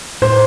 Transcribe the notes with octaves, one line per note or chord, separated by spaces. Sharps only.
A2 C5